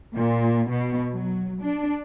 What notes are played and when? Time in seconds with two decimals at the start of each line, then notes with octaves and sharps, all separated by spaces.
0.16 A#2
0.70 B2
1.11 F#3
1.63 D4